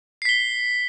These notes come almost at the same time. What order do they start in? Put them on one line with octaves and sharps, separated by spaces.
C7 B6 G7